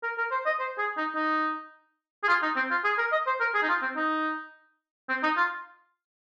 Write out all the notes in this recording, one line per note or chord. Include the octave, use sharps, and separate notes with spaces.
A#4
A#4
C5
D#5
C5
G#4
D#4
D#4
G#4
F4
D#4
C4
F4
G#4
A#4
D#5
C5
A#4
G#4
D#4
F4
C4
D#4
C4
D#4
F4